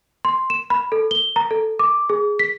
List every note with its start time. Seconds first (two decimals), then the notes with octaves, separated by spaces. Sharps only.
0.25 C6
0.50 E7
0.70 B5
0.92 A4
1.11 G7
1.36 A#5
1.51 A4
1.79 D6
2.09 G#4
2.39 B6